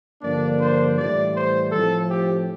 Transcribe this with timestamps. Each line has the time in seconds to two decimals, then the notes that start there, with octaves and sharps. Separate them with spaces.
0.22 G2 D3 F3 A#3 D4 D5
0.60 C5
0.97 A2 E3 G3 D5
1.35 C5
1.72 A2 F3 C4 A4
2.10 G4